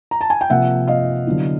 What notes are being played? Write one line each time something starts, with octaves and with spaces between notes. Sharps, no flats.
A#5
A5
G#5
G5
C3 F3 A#3 E5 F#5
D#5 F5
D3 F#3 B3 E4